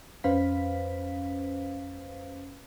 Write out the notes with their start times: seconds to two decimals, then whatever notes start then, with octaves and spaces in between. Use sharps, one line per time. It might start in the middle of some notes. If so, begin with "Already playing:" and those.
0.24 F2 C#4 B4 C5 F5 B6